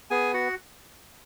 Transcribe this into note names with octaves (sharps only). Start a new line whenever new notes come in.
B3 G#4 G#5
F#4 F#5